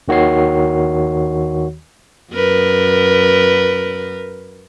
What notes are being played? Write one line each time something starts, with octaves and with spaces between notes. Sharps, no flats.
D#2 D#3 F#4 C#5 C7
F#2 A#4 B4